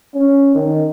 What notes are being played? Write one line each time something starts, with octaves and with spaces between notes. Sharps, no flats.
C#4
D#3